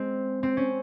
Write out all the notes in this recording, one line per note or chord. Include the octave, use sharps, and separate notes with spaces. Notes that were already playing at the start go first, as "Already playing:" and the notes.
Already playing: G#3 C4
C4
C#4